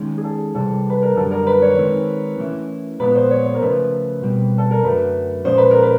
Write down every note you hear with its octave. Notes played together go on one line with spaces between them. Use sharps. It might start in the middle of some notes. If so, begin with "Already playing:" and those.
Already playing: D#3 G#3 C#4
G#4
A4
C3 E3 G3 A4
B4
A#4
F#2 D3 G3 A4
A#4
B4
C#5
D#3 G#3 C4
E3 A3 C#4 E4
A#2 F3 G#3 B3 B4
C5
C#5
C5
A#4
C#3 F3 A3 B4
B2 G3 C4
A4
A#4
F#2 D3 F#3 A3 B4
A#2 F3 G#3 C#4 C5
B4
A#4
B4